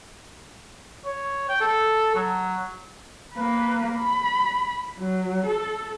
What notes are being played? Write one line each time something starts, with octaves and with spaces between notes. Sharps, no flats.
C#5
G5
A4
F#3
A#3 B4
B5
F#3
A4